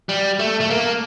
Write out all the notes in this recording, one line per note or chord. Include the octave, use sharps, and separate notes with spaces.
G3
A3
A3
A#3